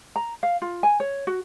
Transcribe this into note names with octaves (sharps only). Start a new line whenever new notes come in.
A#5
F5
F4
G#5
C#5
F#4